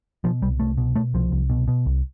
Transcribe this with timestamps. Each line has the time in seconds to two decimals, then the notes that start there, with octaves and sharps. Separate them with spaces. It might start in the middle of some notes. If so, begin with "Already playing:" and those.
0.24 B2 F3
0.42 C2 G3
0.60 C2 A3
0.77 B2
0.96 B2 A3
1.14 C2 F3
1.32 C2
1.50 B2
1.68 B2
1.86 C2